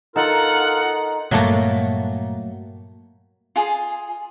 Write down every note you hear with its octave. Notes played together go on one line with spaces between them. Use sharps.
D#4 F4 A4 A#4 F#5
G2 A#2 F#3 A3 A#3
F4 G#4